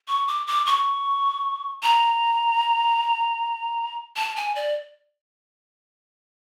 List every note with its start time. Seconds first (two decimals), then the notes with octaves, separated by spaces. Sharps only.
0.08 C#6
0.28 D6
0.47 D6
0.66 C#6
1.83 A#5
4.16 A5
4.36 G#5
4.56 D5